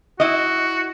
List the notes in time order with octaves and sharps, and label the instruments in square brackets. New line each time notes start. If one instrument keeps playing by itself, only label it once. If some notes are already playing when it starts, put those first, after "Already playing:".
[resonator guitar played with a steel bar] E4 D#5 [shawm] F#4